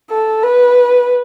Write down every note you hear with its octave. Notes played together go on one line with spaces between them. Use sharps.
A4
B4